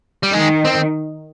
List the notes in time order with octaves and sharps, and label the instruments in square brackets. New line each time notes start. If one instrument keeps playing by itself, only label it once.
[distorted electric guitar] G3
[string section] D#3 [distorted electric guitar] G#3
[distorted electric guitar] C4